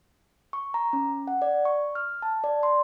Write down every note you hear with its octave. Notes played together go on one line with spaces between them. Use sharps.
C#6
A#5
C#4
F#5
D5
C#6
F6
A5
D5
C6